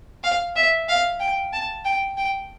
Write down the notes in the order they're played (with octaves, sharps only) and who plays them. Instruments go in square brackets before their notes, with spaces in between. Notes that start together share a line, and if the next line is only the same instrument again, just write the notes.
[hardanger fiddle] F5
E5
F5
G5
A5
G5
G5